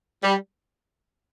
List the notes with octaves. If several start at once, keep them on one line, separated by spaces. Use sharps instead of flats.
G3